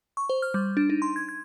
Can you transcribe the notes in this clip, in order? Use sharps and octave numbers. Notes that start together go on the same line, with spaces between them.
C#6
C5
F6
G3
D4
D#4
C6
G#6
G#6